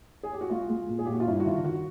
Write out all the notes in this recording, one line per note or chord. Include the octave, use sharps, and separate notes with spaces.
G#4
G4
F#4
G#3 F4
G#3
A#2
G#4
A#2 G4
F#4
F4
G2 E4
F#4
D#3 F4
F#4